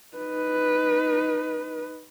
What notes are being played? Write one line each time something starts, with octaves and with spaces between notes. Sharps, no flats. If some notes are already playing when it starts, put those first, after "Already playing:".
D#4 B4